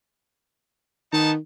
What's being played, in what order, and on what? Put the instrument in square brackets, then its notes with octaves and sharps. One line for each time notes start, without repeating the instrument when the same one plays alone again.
[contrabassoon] D#3 [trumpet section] B3 D#4 A5